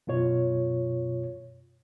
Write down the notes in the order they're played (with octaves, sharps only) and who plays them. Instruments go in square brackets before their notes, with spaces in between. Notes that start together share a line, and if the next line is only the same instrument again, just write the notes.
[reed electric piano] F#2 B2 F4 C#5